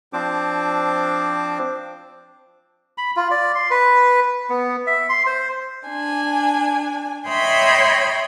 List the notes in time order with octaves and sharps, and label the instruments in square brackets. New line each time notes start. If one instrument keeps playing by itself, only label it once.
[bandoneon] F3 C4 D4 C5 D6
[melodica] B5
F4
D5
C6
B4
B3
E5
C6
C5
[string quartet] D4 G#5
C#5 D#5 E5 G5 B5 C6